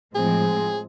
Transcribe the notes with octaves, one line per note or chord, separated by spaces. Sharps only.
A2 F3 G#3 C4 G#4